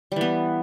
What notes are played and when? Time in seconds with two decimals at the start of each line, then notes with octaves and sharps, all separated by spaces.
0.12 G3
0.16 E3
0.21 B3